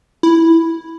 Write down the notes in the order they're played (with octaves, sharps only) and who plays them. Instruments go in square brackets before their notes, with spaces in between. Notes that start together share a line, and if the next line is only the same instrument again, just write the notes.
[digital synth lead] E4